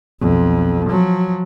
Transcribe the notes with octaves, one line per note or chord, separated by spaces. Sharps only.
B1 F2
F3 F#3